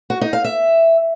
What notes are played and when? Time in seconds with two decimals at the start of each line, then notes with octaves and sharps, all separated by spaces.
0.10 F#4
0.21 D#4
0.33 F5
0.44 E5